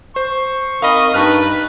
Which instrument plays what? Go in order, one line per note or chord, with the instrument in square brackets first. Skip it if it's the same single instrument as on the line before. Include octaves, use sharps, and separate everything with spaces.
[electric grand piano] C5 [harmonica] C#6
[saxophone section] C4 D#4 A#4 [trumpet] D#5 [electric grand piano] F5 B5
[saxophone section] G2 [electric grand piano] D#4 A5 F6 [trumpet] B4